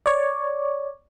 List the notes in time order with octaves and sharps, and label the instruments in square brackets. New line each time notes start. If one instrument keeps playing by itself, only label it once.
[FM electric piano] C#5 D5